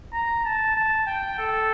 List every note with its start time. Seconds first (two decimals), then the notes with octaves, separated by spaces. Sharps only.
0.13 A#5
0.45 A5
0.75 A5
1.07 G5
1.39 A4